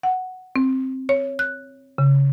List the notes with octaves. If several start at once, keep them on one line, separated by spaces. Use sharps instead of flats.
F#5
C4
C#5
F#6
C#3